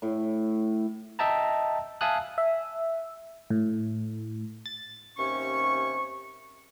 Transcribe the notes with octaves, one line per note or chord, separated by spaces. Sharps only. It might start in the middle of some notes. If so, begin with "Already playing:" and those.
A2
D#5 E5 G5 A5 A#5
E5 F5 G#5 A5 D#6 F#6
E5
A2
A6
D#2 C3 C#4 C#6